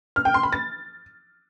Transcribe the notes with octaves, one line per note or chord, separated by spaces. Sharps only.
F6
G5
C6
B5
A6